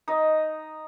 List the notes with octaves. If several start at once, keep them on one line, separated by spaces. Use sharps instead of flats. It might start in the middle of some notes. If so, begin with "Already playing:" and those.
D#4 D#5